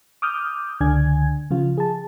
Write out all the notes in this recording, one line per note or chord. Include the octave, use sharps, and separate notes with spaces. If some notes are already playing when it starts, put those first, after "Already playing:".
D6 D#6 F6 G6
C#2 D3 D4 G#5 G#6
C#3 F3 F4
G#4 A5